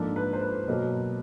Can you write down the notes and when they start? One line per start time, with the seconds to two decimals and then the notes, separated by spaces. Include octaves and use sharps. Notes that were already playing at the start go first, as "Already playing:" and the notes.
Already playing: G#2 F3 A#3 D4 A4
0.16 B4
0.33 C5
0.42 B4
0.68 B2 F#3 A#3